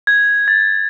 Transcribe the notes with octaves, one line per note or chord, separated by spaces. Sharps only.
G#6
A6